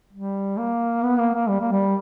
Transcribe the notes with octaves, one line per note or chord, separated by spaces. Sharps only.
G3
A#3
B3
A#3
A#3
G3
A#3
G3